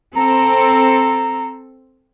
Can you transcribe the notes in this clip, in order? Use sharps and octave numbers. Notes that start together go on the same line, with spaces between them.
C4 A4 A#5